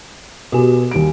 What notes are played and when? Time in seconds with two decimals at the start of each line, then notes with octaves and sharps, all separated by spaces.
0.52 B2 F#4 G4 G#5
0.91 D#2 G3 D7